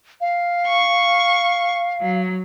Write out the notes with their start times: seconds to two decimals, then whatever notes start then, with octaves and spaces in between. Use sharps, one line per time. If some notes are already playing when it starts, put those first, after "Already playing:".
0.21 F5
0.67 C#6
2.01 F#3